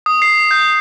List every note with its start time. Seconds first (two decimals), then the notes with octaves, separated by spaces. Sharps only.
0.06 D#6
0.22 C7
0.51 G6